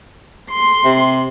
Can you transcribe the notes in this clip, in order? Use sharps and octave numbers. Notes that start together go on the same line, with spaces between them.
C6
C3